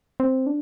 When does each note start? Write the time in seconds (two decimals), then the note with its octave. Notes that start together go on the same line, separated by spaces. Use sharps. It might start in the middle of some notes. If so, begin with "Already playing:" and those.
0.20 C4
0.47 D4